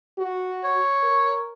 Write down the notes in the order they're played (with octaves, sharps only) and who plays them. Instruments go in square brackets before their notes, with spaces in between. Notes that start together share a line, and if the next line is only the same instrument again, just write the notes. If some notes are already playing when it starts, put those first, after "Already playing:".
[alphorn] F#4
[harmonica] C#5
[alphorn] A#4